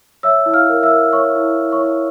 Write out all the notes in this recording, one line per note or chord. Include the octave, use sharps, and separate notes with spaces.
C#5 E5 E6
E4
F5 F6
A#4
E5 E6
A#4
C#5 C#6
E4
E4
C#5 C#6
E4